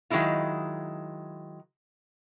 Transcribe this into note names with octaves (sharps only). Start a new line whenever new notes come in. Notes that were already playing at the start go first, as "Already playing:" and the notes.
D#3 F#3 G#3 E4 F4